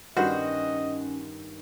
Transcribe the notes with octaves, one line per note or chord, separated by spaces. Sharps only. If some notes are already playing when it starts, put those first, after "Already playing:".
G2 D#3 C#4 F#4 C5 D#5